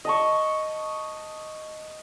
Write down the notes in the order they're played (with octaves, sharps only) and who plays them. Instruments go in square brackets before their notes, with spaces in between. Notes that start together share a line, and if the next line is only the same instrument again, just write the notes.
[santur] D#5 A5 C#6